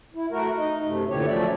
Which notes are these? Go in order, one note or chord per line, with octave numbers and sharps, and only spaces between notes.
E4
A3 F#4 A#4
D#4 D#5
F#2 C3 A3
D2 A#2 D3 E3 G4 C#5
C#3 F3 F#3 A3 D5 E5